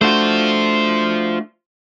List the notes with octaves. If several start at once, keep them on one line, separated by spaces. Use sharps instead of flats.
A3 D4 F4 F#4 C5